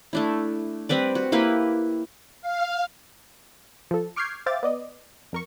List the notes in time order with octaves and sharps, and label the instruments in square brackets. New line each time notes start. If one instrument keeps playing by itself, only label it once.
[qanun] A3 D4 E4
G3 C4 B4 D5
F#4
A#3 E4 G4 B4
[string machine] F5
[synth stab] F3 A4
C#6 D6 F6 G6 G#6 C7
C5 E5 F5 G5 D6 A6
B3 D5 D#5
F2 A#4 C#6